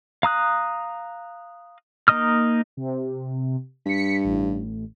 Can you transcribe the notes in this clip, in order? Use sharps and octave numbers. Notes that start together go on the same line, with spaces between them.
F5 A#5 D#6 F#6
A#3 D#4 D#5 D#6 F6
C3
G2 B6 C#7
A1